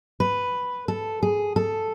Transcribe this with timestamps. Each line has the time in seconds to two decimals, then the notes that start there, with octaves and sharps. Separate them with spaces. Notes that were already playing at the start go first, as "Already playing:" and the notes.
0.20 B4
0.88 A4
1.23 G#4
1.56 A4